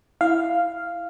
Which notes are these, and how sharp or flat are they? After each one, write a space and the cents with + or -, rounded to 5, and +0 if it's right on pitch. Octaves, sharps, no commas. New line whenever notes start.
E4 +0 F5 -5